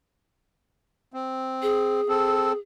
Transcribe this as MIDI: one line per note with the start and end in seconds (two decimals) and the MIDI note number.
1.14 2.01 60
1.62 2.58 68
2.08 2.53 60
2.08 2.53 69